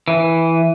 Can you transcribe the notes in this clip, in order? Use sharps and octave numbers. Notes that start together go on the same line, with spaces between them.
E3